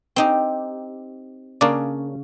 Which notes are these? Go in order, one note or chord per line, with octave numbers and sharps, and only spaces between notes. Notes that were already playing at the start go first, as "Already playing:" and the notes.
C4 D#4 G4
C#3 A#3 D4 D5